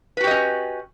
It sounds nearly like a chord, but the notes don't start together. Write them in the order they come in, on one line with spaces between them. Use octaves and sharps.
B4 F#4 G4 D#5 C#4